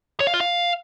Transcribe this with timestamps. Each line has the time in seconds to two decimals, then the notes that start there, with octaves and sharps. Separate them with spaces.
0.20 C#5
0.27 F5
0.34 F4
0.40 F5